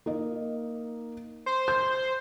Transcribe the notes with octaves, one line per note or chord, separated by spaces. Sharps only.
A#3 D#4 D#5
C5
G6